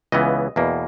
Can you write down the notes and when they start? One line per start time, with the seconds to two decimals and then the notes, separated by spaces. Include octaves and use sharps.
0.12 C#2 C#3 E3 B3 D#5
0.56 E2 B2 A#3